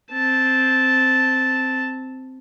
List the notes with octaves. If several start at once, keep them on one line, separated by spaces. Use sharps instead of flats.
C4 A5